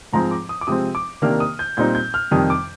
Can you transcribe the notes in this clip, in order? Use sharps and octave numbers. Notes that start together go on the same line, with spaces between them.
G#2 F3 G#3 C4 A#5
D6
D#6
D6
C3 F3 G#3 C4 D#6
D6
C3 D#3 A#3 D4 F6
D#6
G6
A#2 G3 C4 D#4 G6
G6
F6
F2 C3 D#3 G3 D#6
D6